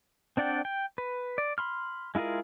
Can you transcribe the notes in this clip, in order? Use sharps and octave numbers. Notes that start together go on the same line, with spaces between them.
C4 D4 D5 F#5 G5
G5
B4
D5
B5 C6 F6
G#3 E4 F4 G#4 A#4